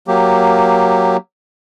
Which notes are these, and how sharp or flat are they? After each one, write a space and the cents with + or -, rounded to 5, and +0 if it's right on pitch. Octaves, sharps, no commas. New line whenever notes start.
F#3 +0 A#3 +0 G4 +0